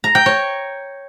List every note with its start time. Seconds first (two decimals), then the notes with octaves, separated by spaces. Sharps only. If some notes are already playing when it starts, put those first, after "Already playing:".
0.04 A#5
0.15 G5
0.26 C#5